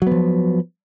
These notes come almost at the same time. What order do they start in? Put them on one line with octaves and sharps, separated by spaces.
F#3 B3 F3